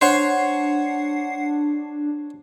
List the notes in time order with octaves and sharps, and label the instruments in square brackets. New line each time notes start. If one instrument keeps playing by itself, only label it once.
[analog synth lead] D4 [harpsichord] C5 C#5 C#6 [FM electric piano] F#5 C7